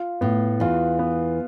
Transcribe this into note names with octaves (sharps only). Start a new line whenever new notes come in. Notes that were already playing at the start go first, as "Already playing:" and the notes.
Already playing: F4
A2 B3
E2 E3 F4
B3